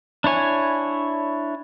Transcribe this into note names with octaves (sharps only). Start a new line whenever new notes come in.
D4 E4 C#5 G#5